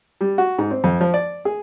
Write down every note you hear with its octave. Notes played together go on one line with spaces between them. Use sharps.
G3
F#4
G#2
C4
F2
F3
D5
G#4